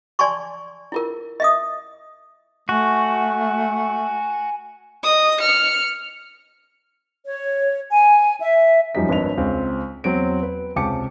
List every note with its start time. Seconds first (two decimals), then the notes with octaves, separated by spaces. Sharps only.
0.19 D5 G#5 A5 C6 C#6
0.92 E4 F4 A#4
1.40 D#5 E5 D#6
2.69 A3 F#4 G#5
5.04 D#5 D#6
5.41 F6 C#7
7.26 C#5
7.92 G#5
8.40 E5
8.95 F#2 F3 G3 D#4 B6
9.08 G#1 D4 B4 C#5 D#5 F7
9.37 C#2 C4
10.04 E2 F#3 C4 D7
10.43 B4
10.76 C#2 C3 G4 A5 D6 C#7